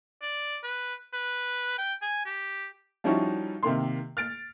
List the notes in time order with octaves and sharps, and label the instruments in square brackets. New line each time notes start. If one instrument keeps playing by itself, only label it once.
[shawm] D5
B4
B4
G5
G#5
G4
[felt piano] F3 G3 C#4 D#4 E4 F#4
C3 D#3 A#3 C6
F6 A6 D7